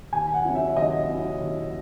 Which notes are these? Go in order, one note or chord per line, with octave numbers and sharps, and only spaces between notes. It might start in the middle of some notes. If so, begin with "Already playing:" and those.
D#2 G#5
F#5
C#3 F#3 C#4 E4
E5
D#2 D#5
C#3 F#3 C#4 E4
D#2